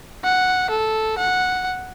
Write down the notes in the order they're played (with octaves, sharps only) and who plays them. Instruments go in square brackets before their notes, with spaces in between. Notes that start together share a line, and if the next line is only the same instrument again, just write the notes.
[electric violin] F#5
A4
F#5